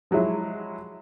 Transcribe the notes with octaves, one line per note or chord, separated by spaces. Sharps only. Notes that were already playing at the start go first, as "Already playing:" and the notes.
F3 F#3 G#3 E4